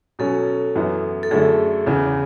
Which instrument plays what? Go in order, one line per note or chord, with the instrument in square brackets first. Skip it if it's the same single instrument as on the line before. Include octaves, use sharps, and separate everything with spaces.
[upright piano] B2 F#3 C#4 [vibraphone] A4
[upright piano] F#2 E3 B3 E4
[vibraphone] A4
[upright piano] F#2 D3 A3 E4 [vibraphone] G#4
[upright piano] E2 C#3 E3